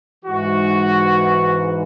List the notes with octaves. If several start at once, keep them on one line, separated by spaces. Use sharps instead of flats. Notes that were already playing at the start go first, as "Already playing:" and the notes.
G#2 E3 F#4